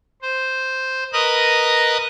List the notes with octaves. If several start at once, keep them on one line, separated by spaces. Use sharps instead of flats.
C5
A#4 B4 D#5 D#6 F#6